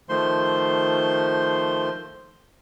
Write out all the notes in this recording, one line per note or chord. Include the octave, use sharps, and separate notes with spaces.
D#3 F3 A3 C5 C6